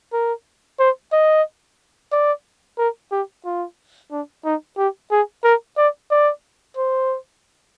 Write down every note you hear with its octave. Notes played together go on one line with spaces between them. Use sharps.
A#4
C5
D#5
D5
A#4
G4
F4
D4
D#4
G4
G#4
A#4
D5
D5
C5